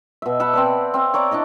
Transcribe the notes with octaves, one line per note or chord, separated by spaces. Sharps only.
B2 E5
E5 F#5 A5 B5
C4 B4 D5
C4 F5
C#5 D5 A#5 D6
D4 E4 D5 D#5